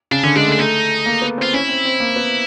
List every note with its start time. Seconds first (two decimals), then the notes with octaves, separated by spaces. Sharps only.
0.11 C#3 D4
0.23 D3 C#4
0.36 G#3 D4
0.48 A3
0.52 D4
0.59 A3 D#4
1.06 A#3
1.22 B3
1.38 C4
1.42 F4
1.53 C#4 E4
1.68 C4
1.85 C4
2.00 A#3
2.16 B3